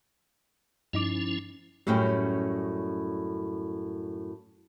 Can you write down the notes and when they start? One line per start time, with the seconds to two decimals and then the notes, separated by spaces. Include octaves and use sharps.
0.93 G2 F3 C#4 D#4 E4 D6
1.87 F#2 A2 G3 C#4 G5